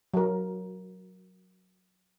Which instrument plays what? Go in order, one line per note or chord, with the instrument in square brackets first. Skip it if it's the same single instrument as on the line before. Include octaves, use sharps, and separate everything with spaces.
[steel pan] F#3 A#4